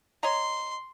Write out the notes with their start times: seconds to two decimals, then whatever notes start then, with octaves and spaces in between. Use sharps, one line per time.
0.23 C#5 D#5 A#5 C6